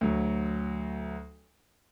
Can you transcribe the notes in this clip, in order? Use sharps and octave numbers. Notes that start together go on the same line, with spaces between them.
D2 F#3